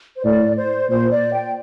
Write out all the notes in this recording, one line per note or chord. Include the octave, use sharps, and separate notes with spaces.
C5
A2 D5
C5
A#2 C5
D5
G5